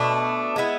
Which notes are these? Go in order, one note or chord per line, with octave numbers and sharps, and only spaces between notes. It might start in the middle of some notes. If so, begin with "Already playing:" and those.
Already playing: B2 A3 D4
G#3 B3 E4